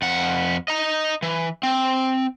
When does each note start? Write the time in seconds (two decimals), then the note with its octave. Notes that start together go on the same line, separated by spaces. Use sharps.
0.02 F2 F#5
0.68 D#5 A#5
1.22 E3
1.63 C4